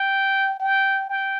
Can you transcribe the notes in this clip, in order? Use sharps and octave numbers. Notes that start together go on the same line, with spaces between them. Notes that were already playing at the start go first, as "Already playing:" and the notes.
Already playing: G5
G5
G5